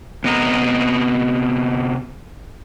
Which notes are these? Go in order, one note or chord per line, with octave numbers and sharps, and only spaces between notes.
C3 B3 D#5 A#5